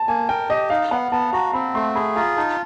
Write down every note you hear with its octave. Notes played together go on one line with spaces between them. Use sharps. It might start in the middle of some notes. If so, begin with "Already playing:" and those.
Already playing: A5
A#3 G#5
A#4 G5
G4 D#5
D#4 F5
B3 F#5
B3 A5
F#4 A#5
C4 B5
A3 C6
G#4 B5
F4 A#5
D#4 A5